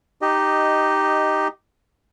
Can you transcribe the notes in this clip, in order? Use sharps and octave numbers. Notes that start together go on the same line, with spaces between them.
D#4 G4 D#5